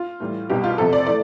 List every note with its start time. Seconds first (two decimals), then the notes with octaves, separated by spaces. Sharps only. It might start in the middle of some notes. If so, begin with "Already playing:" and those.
Already playing: F4
0.20 A2 E3 G3
0.49 C2 B2 G3 G4
0.64 F4
0.78 F2 C3 F3 A4
0.93 D5
1.07 E3 A3 D5